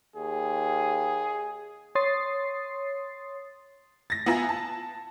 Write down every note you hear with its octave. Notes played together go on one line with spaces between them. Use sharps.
D#2 G#4
C#5 C6 D#6 A6 C7
A6 A#6
B3 E4 F4 G#5 A#5
A5